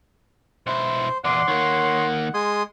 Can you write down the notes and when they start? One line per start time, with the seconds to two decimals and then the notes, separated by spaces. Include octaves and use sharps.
0.67 B1 E4 C5
1.24 E2 A#2 D5 F#5 C6
1.48 D#3 A#3 C#5
2.34 G#3 C6 D#6 G#6